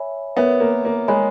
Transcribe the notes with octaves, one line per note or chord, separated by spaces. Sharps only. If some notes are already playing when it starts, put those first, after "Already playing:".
Already playing: C#5 E5 G#5 B5
B3 A#4 C#5 E5
A#3
A#3
G#3 C#5 G#5 B5